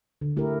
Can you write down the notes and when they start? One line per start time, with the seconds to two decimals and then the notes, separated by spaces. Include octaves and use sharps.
0.21 D3
0.37 A3 E4 G4 A#4